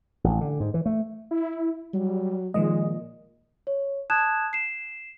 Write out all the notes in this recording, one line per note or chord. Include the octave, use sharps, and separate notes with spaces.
A1
D3
G#2
E3
A3
E4
F#3 G3
A#2 D#3 F3 G#3 D#5
C#5
A5 D#6 F#6 G#6 E7
C7 E7